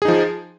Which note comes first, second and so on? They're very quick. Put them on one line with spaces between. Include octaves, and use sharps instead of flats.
G#4 D#4 F3